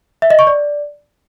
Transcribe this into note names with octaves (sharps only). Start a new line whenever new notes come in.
E5
D#5
C#6
D5